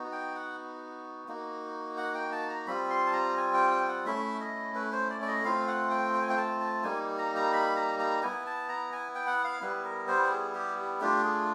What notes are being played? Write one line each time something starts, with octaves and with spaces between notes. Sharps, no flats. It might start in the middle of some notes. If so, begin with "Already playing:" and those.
Already playing: B3 D#4 F#4
G5
F#5
A#3 D#4 F#4
F#5
G5
A5
A#5
G3 C4 F4 B5
C6
A5
A#5
G#5
G5
G5
F#5
A3 C#4 E4 E5
D#5
B4
C5
D5
D5
D#5
A3 C4 F4 F5
F#5
G5
G5
G#5
G5
A5
A5
G3 A#3 D#4 G#5
A#5
A#5
B5
A#5
A#5
B3 E4 G#5
A5
A#5
G#5
G5
F#5
F5
G3 B3 E4 B4
A#4
C5
G#4
G4
A3 D4 F4 G4
G#4